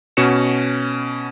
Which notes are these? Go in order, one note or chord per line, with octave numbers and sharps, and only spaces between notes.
B2 C#4 F#4 B4 C#7 E7